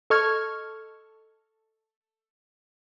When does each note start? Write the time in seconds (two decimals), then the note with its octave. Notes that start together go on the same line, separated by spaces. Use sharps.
0.10 A4 D#5 C#6 F6 G#6